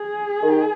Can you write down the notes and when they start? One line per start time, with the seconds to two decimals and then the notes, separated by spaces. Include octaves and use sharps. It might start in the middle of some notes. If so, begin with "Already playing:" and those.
Already playing: G#4
0.42 D#3